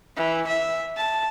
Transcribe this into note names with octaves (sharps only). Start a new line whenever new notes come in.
E3
E5
A5